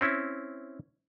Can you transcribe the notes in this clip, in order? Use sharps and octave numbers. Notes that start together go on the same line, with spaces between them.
C4 C#4 E4